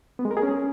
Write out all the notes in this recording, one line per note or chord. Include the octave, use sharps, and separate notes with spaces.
B3
G#3
A#4
G#4
C#4